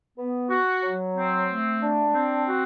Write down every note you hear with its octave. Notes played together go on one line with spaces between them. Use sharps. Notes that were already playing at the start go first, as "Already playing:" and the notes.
B3
F#4
F#3
C4
A3
D4
C4
F#4